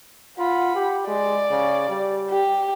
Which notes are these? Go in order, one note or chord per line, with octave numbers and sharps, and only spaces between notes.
F4 F#5 B5
G4
G#3 D5
C#3
G3
G4